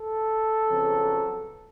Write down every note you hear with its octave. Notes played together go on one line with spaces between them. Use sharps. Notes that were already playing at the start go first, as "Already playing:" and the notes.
Already playing: A4
F2 C#3 F#3 B3